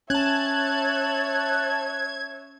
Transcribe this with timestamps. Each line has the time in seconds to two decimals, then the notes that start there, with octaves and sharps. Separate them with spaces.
0.10 C#4 C#5 E5 A5 F#6 G#6